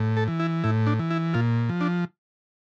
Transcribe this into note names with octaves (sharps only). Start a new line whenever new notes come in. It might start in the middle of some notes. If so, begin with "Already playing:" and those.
Already playing: A2
A4
E3
E4
A2 E4
D4
E3
E4
A#2 F4
F3
D4